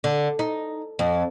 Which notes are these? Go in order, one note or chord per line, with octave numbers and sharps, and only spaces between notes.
D3
D#4
F2